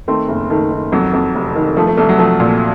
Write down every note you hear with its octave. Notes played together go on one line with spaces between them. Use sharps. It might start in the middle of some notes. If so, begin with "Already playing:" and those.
D#3 A3 C4
F#1
D#3 A3
D#3
F2 F#3
F2
F1
D#3
F3 A3
A3
C2 A3
F#3
F3 A3
A#2